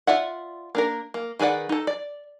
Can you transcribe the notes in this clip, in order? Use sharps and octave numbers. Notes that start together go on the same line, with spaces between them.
F4 D5 E5 F#5
A#3 D4 A#4
A#3
D#3 G#4 B4 D5 F#5
D#4 A4
D5